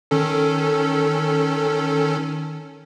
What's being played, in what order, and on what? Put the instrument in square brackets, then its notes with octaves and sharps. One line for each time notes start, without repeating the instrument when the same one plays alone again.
[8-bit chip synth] D#3 C#4 A4